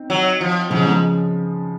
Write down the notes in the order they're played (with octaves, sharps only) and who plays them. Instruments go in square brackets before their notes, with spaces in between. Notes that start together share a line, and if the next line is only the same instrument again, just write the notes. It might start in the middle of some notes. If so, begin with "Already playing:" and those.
Already playing: [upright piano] C4 D#4
[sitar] F#3
F3
[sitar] G#2 [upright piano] C#3 F3
[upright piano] F3 G#3